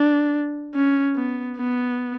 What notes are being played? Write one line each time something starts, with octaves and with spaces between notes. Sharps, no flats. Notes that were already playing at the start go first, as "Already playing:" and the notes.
Already playing: D4
C#4
B3
B3